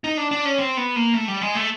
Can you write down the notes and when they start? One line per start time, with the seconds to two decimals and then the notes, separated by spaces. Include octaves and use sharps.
0.04 D#4
0.17 D4
0.31 D4
0.45 C#4
0.59 C4
0.77 B3
0.96 A#3
1.14 A3
1.28 G3
1.41 G#3
1.55 A3